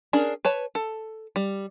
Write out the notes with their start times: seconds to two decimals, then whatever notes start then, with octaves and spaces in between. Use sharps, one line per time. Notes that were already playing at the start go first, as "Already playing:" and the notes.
0.13 C#4 D4 G#4 A#4
0.45 B4 C#5 A5
0.75 A4
1.36 G3